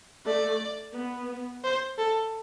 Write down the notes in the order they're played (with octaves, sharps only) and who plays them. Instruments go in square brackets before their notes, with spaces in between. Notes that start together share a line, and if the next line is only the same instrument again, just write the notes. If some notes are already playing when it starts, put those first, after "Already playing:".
[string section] A3 [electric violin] D5
[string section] B3
[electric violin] C5
A4